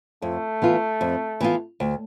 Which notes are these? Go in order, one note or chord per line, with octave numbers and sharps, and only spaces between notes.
F2 A3
E3 B3 F4
F2
E3 B3 F4
D2